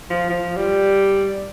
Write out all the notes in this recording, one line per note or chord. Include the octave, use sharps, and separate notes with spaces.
F3
F3
G3